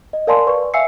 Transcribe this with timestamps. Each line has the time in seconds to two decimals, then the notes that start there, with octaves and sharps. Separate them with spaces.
0.13 D#5
0.27 A#4 D5 F5 G#5 A5 C6
0.47 B4 D5 C#6
0.74 E5 F5 G#5 E6 C7 C#7